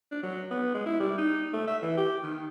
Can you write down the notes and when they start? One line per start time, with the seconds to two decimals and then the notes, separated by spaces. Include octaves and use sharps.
0.11 D4
0.23 F#3
0.51 B3
0.74 G#3
0.86 E4
1.00 G3
1.18 D#4
1.53 A3
1.67 E5
1.82 E3
1.97 G4
2.23 D#3